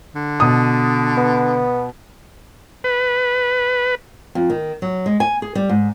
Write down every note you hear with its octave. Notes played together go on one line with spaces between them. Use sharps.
D3
B2 D#6
B3
B4
F2
D#3
F#3
G#3
G#5
G#4
G3
G#2